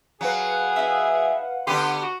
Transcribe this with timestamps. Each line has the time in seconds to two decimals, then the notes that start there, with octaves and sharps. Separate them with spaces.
0.21 F#3 G#4 B4 F5 F#5
0.76 D#4 E5
1.67 D3 B3 G4 B4 C6
2.02 F#4